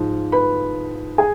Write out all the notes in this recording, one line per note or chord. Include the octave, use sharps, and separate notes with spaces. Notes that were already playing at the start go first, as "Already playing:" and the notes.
Already playing: G#2 F3
B4 B5
G#4 G#5